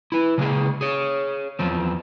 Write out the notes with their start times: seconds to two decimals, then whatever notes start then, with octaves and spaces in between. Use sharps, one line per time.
0.12 E4 B4
0.38 C#3 G#3 A#3 G#4
0.81 G#4 C#5
1.59 E2 F3 C4